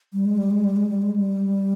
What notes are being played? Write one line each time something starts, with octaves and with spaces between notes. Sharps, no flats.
G3
G#3
G3
G#3
G3
G#3
G3
G#3
G3